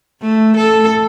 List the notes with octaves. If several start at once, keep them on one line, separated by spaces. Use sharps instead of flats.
A3
A4